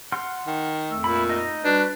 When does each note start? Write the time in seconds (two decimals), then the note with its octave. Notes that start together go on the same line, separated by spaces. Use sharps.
0.12 F#5 C6 F6
0.47 D#3
0.90 F2 A3 E6
1.04 A#2 E4 B5
1.29 D#4 D#5
1.64 G3 D4 F#4 B4